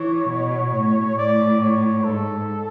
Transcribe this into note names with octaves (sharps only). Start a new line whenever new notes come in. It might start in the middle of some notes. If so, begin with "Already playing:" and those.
Already playing: E3 C#5
B2
A2
A2 D5
C#5
G#2 A4